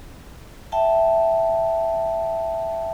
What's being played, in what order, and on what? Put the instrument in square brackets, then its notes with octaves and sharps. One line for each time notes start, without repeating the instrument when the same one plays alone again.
[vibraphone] E5 G5 A5